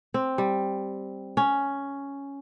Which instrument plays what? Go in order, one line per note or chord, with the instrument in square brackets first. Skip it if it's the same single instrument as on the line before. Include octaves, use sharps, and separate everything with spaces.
[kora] C4
G3
C#4